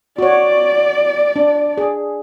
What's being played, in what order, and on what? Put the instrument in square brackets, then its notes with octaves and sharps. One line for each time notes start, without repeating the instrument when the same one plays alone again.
[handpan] F#4 C#5 [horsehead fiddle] D5
[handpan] D4
G#4